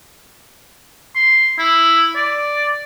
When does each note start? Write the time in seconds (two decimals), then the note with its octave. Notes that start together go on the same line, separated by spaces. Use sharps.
1.15 C6
1.59 E4
2.15 D5